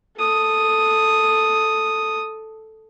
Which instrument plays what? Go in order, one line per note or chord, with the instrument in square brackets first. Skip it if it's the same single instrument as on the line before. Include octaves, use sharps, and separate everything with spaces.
[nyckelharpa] A4 D#6